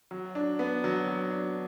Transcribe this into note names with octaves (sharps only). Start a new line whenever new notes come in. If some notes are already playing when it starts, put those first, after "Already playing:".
F#3
D4
B3
F#3
F#3
D4